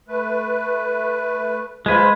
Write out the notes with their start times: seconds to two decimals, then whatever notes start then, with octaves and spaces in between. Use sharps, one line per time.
0.08 A3 B4
1.86 G#3 F4 B4 C5